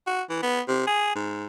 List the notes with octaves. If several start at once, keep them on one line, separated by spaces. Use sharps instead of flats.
F#4
E3
B3
C3
G#4
G#2